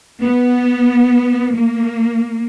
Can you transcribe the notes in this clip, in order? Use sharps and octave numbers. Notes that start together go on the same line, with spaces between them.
B3
A#3